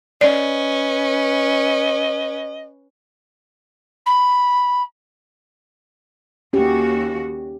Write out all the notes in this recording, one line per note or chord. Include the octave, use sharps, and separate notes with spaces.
C#4 B4 D5 D#5
B5
D#2 C#4 F#4 G4